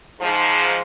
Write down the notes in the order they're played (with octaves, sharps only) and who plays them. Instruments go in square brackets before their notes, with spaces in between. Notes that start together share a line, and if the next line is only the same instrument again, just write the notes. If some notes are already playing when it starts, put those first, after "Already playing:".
[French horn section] G#2 F3